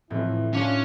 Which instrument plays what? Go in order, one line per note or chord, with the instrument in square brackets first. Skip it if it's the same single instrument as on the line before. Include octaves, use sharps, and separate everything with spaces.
[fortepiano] F2 E3 [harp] A2 [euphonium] E4
[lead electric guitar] C#4 C#5 [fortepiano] D4 F4